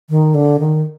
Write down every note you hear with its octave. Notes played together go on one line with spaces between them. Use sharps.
D#3
D3
D#3